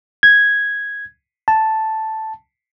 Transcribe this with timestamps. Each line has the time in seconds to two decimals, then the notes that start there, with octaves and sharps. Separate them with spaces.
0.23 G#6
1.48 A5